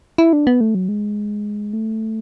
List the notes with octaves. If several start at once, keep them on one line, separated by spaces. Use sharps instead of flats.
E4
D4
B3
A3
F#3
G#3
A3